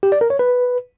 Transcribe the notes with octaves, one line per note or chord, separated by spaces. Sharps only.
G4
D5
A#4
C#5
B4